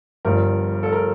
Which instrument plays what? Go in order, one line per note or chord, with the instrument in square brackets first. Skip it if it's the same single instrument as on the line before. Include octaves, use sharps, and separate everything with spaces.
[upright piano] G1 G2 F3 A#4
A4
A#4